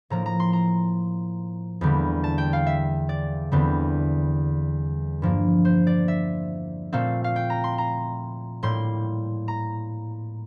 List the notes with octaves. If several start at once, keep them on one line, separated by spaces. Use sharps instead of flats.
A2 F3 A#3 A#5
A#5
C6
A#5
E2 D3 G3 A#3
A5
G5
F5
E5
D5
E2 D3 G3 C4
G2 F3 A#3
C5
D5
E5
A#2 A3 C4 F5
F5
G5
A#5
C6
A#5
A2 G3 A#3 C6
A#5